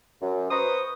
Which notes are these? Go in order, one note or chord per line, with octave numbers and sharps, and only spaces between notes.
F#2
B4 C5 A#5 C6 C#6 D#6